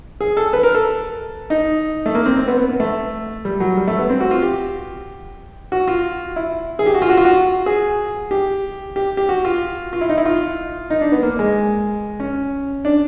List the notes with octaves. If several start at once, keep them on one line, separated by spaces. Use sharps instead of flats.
G#4
A4
B4
A#4
A4
D#4
A3
A#3
C4
C4
B3
B3
B3
A3
G3
F#3
G3
A3
B3
C4
F#4
F4
G4
F#4
F4
E4
G#4
G4
F#4
F4
F#4
F4
F#4
G#4
G4
G4
G4
F#4
F4
F4
E4
D#4
E4
F4
D#4
D4
B3
A#3
G#3
C#4
D4